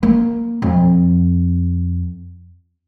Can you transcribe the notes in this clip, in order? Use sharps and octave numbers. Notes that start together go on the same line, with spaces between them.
A#3
F2